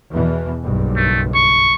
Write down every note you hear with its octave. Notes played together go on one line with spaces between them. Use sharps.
E2 B2 E3
F#1 B1 G2
A3
C#6